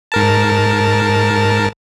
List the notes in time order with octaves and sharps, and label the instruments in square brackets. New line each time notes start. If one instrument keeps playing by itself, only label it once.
[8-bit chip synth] G#2 A#4 A5